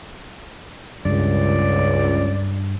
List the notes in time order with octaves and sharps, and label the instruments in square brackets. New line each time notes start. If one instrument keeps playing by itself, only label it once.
[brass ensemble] C#2 [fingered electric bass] G2 [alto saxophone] D5